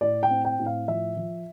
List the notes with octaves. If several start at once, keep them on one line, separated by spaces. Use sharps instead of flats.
A2 D5
G5
C4
G5
A2
F5
F3 E5
F3